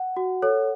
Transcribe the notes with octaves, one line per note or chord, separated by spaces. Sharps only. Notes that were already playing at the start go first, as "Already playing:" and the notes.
Already playing: F#5
F#4
A4 C#5